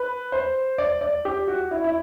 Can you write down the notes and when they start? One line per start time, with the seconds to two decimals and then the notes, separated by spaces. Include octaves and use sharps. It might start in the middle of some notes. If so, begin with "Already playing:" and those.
Already playing: B4
0.32 C5
0.78 D5
1.01 D5
1.25 G4
1.48 F#4
1.71 E4
1.84 E4